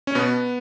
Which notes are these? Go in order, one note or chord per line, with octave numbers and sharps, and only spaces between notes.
C#4
B2 B3